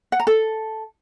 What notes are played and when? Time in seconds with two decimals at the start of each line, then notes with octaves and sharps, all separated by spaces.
0.12 F#5
0.20 A#5
0.27 A4